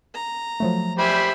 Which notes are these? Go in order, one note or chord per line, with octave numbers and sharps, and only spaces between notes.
A#5
F3 F#3 A3
G4 C5 E5 G#5 B5